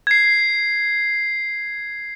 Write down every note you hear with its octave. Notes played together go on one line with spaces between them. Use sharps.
G#6 C7